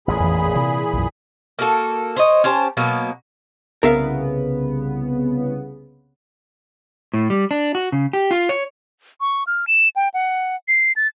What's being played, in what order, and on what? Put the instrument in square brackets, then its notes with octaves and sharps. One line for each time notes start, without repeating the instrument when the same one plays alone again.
[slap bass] A1 E2 [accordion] A#2 G#4 B5
[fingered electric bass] F2 E3
[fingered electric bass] C3 [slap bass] E3
[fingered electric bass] B1 F#2
[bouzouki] A#3 F#4 A4
C5 C#5 D#5
C#4 G4 C5 A5
B2 F#3 A#3 B3
[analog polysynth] C2 C#3 B3 [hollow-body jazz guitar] A#4 E5 F5
[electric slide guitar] A2
G3
D4
F#4
C#3
G4
F4
C#5
[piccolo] C#6
F6
E7
G5
F#5
C7
A6